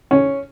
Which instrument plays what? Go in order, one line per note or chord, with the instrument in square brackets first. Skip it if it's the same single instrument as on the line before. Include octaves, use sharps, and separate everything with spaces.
[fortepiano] C#4